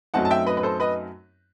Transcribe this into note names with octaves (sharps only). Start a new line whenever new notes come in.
F#2 F#3 A3 C4 D#4 F#5 A5
A5
E5 G5
B4 D#5
B4
A4 C5
B4 D#5